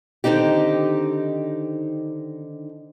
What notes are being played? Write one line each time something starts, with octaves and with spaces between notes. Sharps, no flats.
D3 D#3 C4 D#4 G4